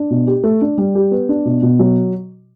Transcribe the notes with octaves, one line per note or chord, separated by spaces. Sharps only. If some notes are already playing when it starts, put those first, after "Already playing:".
Already playing: D4
B2
G4
A3
D4
G3
G4
B3
D4
B2
B2
F#3